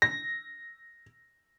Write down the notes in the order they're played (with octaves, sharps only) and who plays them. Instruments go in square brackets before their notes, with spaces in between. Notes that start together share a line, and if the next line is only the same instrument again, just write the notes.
[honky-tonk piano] A#6